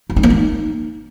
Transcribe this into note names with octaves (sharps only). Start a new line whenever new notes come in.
E4
D#4
A#3
D#4